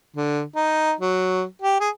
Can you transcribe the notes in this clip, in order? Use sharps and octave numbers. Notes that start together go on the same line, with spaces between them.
D3
D#4
F#3
G4
G#4